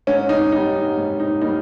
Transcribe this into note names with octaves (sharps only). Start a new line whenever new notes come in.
G#2 C#4
D#4
G3 A#3 D#4
G#2
D#4
G3 A#3 D#4